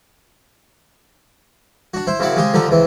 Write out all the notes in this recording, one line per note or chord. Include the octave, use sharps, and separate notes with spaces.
D4 F#4
E4 C5
F#2 C#3 C4 E4 D5 F#5
C#3 G#3 C4 G4 G#4
D3 F3 D#4 G4 A4
C#2 C3 E3 C4